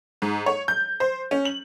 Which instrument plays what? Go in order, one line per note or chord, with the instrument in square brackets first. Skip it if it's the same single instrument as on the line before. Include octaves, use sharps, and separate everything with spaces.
[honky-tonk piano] G#2
C#5
G6
C5
C#4
F#7